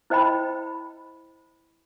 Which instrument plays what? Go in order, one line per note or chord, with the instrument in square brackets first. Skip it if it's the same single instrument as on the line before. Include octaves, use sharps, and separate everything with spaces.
[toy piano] E4 C5 D#5 G5 B5